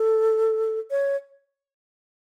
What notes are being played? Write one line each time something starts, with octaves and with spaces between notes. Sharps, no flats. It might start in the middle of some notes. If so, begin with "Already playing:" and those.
Already playing: A4
C#5